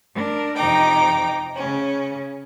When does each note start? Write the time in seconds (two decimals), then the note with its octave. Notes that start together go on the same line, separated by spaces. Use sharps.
0.15 D4 A#4
0.56 F2 C3 D#4 G5 A#5 D6
1.56 C#3 C#4